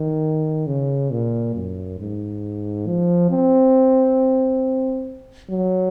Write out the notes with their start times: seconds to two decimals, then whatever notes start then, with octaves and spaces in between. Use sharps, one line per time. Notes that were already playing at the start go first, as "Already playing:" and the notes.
Already playing: D#3
0.67 C#3
1.11 A#2
1.55 F#2
1.99 G#2
2.87 F3
3.30 C4
5.50 F#3